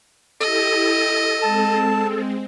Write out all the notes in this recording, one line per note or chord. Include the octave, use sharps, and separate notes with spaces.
E4 G4 A4 D#5 D#6
G#3 C4 A5